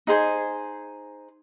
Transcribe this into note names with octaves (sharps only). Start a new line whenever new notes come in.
D#4 G#4 C5 G#5